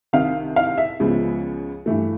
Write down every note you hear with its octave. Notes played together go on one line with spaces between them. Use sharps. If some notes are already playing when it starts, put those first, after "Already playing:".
C2 C3 D#3 F5
F5
E5
C#2 C#3 F3 G#3 B3
G2 E3 A3